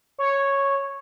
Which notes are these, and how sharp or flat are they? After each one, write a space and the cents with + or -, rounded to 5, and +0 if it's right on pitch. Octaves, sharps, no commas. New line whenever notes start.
C#5 -5